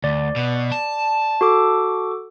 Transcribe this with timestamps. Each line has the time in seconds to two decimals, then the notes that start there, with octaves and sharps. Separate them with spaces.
0.04 D2 D5
0.36 B2
0.72 A5
1.41 F#4 A4 D6